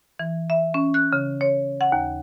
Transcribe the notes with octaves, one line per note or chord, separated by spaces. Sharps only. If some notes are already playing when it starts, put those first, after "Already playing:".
E3
E5
C#4
F#6
C#3
C#5
F#5
D#2